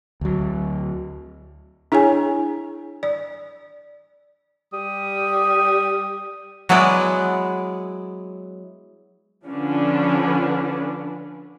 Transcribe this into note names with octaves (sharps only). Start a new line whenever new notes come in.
D2 F#3
D4 E4 G#4 C#5 G#5
D5
G3 D#6
F#3 G#3 B3 E4 B4 D5
D3 F3 C#4 D4 B4